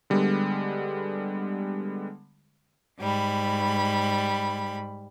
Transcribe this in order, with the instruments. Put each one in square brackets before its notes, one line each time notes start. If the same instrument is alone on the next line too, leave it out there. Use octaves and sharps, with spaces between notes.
[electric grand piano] D3 G3 G#3 B3
[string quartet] G#2 G3 B5